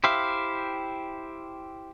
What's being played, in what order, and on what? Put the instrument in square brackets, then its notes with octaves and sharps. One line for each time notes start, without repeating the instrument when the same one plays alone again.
[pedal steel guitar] E4 G4 C5 E5 F5